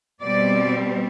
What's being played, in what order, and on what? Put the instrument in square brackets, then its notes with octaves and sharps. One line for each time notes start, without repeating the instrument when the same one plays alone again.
[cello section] B2 G3 C4 D5